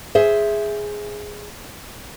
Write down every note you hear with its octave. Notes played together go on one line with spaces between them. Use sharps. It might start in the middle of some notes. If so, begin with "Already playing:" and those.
G#4 C5 E5